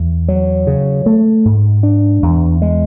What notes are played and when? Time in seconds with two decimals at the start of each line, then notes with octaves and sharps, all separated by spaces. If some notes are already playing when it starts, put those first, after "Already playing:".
Already playing: E2
0.28 F#3
0.67 C#3
1.06 A3
1.45 G#2
1.83 D4
2.22 E2
2.62 G#3